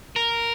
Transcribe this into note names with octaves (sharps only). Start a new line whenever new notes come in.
A#4